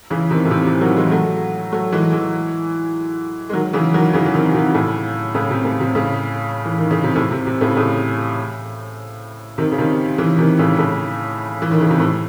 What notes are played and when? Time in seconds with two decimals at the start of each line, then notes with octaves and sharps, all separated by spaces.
0.10 C#3 E3
0.31 C3 D#3
0.45 A2
0.51 C3
0.67 C3
0.81 D#3 F#3
0.96 E3 G#3
1.11 F#3 A3
1.72 F#3 A3
1.93 E3 G#3
2.12 E3 G#3
3.49 G#3
3.53 D#3 F#3
3.73 C#3 E3
3.94 D#3 F#3
4.13 C#3 E3
4.26 E3
4.33 C3 D#3
4.54 C3 D#3
4.74 A2 C#3
5.35 A2 C#3
5.50 C3
5.65 A2
5.81 C3
5.95 A2 C#3
6.65 E3
6.78 D#3
6.91 C#3
7.04 C3
7.16 A2
7.31 C3
7.47 C3
7.61 A2 C#3
7.76 A2 C#3
9.58 C3 D#3
9.72 C#3
9.78 C3 D#3
10.18 C#3 E3
10.38 C3 D#3
10.59 A2 C#3
10.78 A2 C#3
11.62 E3
11.71 D#3
11.81 C#3
11.90 C3
12.00 A2